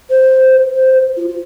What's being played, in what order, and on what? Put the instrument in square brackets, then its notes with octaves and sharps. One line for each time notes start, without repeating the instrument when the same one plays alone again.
[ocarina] C5
C5
F4
F4